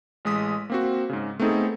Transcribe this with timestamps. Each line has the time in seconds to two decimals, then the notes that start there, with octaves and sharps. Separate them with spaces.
0.25 A1 G#3 D#6 B6
0.70 A#3 C4 F#4
1.09 G#2 C#3
1.39 A3 B3 C4 D#4 G#4 A4